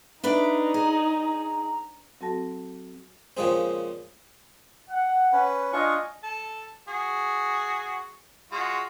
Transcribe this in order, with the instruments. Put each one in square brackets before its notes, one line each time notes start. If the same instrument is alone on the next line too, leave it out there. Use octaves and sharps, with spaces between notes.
[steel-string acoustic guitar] D4 B4 D5 [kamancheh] D#4 [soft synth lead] E5
[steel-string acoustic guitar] G#4 [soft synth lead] A#5
[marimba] F#3 C4 F#4 A4 A5 A#6
[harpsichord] A#2 C#3 F3 G#3 C4
[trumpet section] F#5
[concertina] C#4 B4
[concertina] D4 F4 C#6 [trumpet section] D#5 G#5
[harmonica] A4 A5
F#4 G#4
G#3 F4 F#4